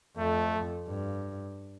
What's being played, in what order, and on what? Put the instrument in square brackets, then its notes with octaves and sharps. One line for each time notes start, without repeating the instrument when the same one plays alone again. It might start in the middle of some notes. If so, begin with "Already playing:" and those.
[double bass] F2 [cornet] A3
[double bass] G2